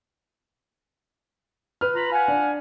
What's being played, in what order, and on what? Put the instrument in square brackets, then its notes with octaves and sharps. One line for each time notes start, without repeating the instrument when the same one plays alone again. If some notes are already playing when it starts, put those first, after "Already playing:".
[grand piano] B4 F6
[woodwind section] F4 A#5 B5
F5 F#5 G#5
[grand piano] D4